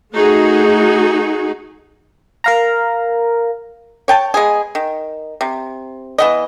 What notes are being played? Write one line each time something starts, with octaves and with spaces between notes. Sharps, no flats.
A3 D#4 F#4 G#4
A#4 F5 A#5
C#5 G5 A5
G#3 B3 G#4
D#3
C3
E3 B3 D#5